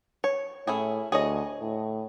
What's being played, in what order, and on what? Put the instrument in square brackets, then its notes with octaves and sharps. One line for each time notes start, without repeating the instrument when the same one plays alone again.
[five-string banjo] C#5
[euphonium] A2 [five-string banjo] C#4 E4 G#4
[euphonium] D2 [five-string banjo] G#4 C#5 D#5
[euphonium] A2